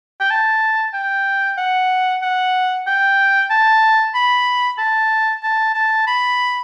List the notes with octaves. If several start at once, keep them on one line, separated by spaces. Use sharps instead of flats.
G5
A5
G5
F#5
F#5
G5
A5
B5
A5
A5
A5
B5